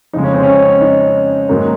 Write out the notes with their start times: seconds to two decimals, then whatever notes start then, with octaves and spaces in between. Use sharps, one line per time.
0.13 F2 C#3 G#3 D#4
0.24 C#4
0.34 C4
0.43 C#4
0.81 D#4
1.49 G#2 D#3 F#3 A#3